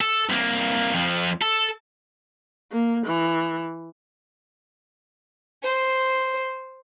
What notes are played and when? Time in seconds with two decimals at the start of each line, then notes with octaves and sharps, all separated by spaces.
0.01 A4
0.30 C2 A#3
0.94 F2 F3
1.41 A4
2.72 A#3
3.07 E3
5.63 C5